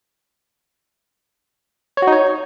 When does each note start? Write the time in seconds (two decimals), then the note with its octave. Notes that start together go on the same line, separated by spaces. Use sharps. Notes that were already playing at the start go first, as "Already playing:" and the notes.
1.97 C#5
2.02 F#4
2.07 D#4
2.12 C#5